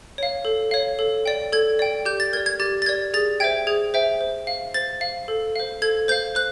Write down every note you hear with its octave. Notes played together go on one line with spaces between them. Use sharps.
C#5 F5
A4
C#5 F5
A4
D5 G5
A4 G#6
D5 G5
G4 G6
A6
A#4 D5 G#6
G#6
G4 A6
A6
A#4 D5 G#6
G#4 A6
C5 E5 G5 G#6
G#4 G#6
C5 E5 G5
C5
F5
C5 A6
F5
A4
C5 F5
A4 G#6
C5 F5 G6
C5 F#6